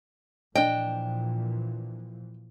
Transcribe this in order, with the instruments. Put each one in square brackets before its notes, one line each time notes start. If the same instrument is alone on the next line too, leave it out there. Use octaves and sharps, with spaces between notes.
[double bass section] A#2 E3 F3 [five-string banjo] D4 D#5 [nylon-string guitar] G5